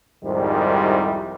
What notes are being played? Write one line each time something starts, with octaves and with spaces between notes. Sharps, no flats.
C2 F2 G#2 C3 D#3 G3